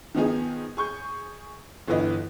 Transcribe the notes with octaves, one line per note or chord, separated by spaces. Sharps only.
D#3 F3 B3 D#4 G#4
G#4 C#6 G6
G1 D3 E3 F4 B4 D#5